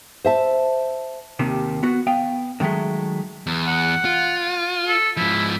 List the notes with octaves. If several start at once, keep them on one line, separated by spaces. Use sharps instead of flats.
C5 E5 A5
D#2 C3 D#3
B3 F#4
B3 F5 G5
D3 D#3 F#3 G#3 A3
E2
F#5
F4
A4
G#2 F3 E4